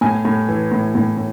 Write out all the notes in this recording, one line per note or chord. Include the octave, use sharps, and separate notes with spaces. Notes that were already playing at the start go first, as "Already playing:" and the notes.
A2 G#5
A2
E3
A2
A2
A2